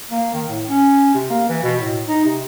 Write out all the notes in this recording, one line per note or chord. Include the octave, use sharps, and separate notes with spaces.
A#3
D#3
A2
C#4
C3
A#3
E3
B2
A2
D#4
C3